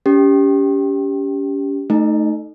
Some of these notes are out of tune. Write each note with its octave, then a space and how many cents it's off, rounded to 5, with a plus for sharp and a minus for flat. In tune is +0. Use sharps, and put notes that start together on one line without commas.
C#4 +35 G4 +0
A3 +0 D#4 -5